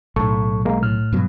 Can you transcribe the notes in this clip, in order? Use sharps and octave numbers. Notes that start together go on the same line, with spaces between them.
B1 A2 A4 C#6
G#3 A#3
A2 F6
G2 B2 F#3